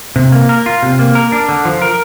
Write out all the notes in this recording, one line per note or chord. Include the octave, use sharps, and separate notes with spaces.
C3
A#3
A#4
F4
C3
A#3
A#4
D4
D3
F3
A#4